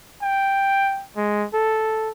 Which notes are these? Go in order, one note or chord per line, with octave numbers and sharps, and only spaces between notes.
G5
G#3
A4